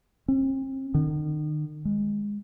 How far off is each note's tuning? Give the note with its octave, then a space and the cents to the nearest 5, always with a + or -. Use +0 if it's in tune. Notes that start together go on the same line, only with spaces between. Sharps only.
C4 +40
D#3 -40
G#3 -15